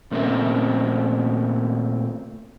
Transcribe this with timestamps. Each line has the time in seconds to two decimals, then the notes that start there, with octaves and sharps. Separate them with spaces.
0.11 A#2 A3 C4 C#4 A#4 E5